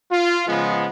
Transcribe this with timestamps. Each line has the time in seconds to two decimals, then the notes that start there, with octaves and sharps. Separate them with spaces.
0.11 F4
0.47 C#3 F3 G#3 B3